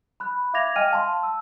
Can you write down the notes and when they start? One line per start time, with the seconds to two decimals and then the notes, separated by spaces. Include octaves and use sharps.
0.20 B5 F#6
0.54 E5 F5 D6 G#6 A#6 F7
0.76 D#5 G5 G#5 F6 D#7
0.91 F5 A5 C6
1.23 E6